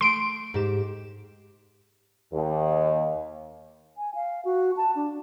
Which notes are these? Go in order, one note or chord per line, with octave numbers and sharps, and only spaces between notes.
A3 C6 D7
G#2 G4 E7
D#2
G#5
F5
F#4
A5
D4